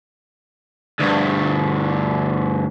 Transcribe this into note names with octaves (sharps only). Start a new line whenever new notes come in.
D2 G2